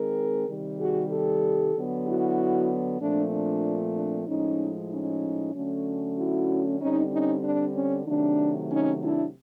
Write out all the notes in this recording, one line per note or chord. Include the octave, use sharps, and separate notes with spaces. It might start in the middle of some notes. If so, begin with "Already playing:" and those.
Already playing: D#3 G#3 C4 G#4 A#4
C3 D#3 G3
F#4 G#4
G4 A4
D3 F#3 B3
E4 F#4
A#2 F3 A3 C4 D4
D4
D4
A2 F3 G#3 C#4 D#4
C#4 D#4
D3 F#3 A3 C#4
E4 F#4
D3 G3 C4 C#4 D#4
C#4 D#4
D4
C#4
C3 D#3 F#3 A3 D4
C#4 D#4
D4 E4